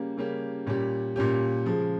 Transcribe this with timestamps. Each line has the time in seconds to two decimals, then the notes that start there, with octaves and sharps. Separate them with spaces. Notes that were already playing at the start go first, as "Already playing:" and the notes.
Already playing: C#3 G3 A#3 C#4 G4
0.17 C#3 G3 A#3 C#4 G4
0.67 A#2 G3 C#4 G4
1.16 A#2 G3 C#4 G4
1.66 C#3 F3 G#3